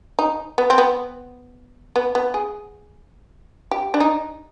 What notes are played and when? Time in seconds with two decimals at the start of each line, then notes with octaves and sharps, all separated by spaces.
0.19 D#4
0.58 B3
0.70 C4
0.78 B3
1.96 B3
2.15 B3
2.34 G#4
3.71 G4
3.94 D4
4.00 D#4